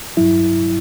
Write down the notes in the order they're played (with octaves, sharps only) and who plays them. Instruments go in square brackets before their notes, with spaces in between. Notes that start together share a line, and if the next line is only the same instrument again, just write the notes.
[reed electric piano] G2 F#3 E4